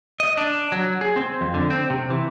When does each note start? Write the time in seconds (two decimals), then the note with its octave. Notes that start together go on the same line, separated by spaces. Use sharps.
0.20 D#5
0.37 D4
0.72 F#3
1.01 G#4
1.16 C4
1.41 F2
1.54 D3
1.70 C4
1.90 C3
2.10 E3